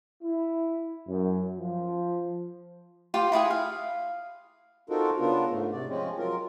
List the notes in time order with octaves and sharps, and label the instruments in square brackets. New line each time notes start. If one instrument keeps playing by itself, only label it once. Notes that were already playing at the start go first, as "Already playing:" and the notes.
[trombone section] E4
F#2
F3
[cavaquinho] F4 G4 C5 G5
E4 F4 G#4 F#5
F5
[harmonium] C4 D#4 F4 F#4 A4 A#4
C#3 B3 D4 F4 A#4
G#2 A3
C3 D5
F3 G#3 C4 C#4
F#3 F4 A#4